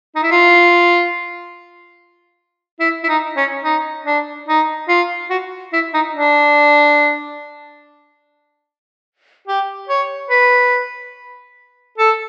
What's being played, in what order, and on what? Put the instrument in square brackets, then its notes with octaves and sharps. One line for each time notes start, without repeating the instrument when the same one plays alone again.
[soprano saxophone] D#4
E4
F4
E4
E4
D#4
C#4
D#4
D4
D#4
F4
F#4
E4
D#4
D4
G4
C#5
B4
A4